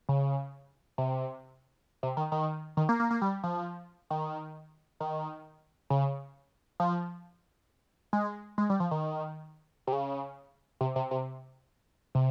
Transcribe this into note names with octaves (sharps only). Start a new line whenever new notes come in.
C#3
C3
C3
D#3
D#3
D#3
A#3
A#3
A#3
G3
F3
D#3
D#3
C#3
F3
G#3
G#3
G3
F3
D#3
C3
C#3
C3
C3
C3
C3